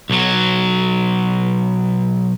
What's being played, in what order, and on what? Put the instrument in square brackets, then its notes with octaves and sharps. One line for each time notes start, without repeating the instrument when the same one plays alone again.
[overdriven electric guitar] B1 F#3